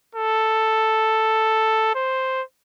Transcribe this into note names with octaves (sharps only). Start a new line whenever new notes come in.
A4
C5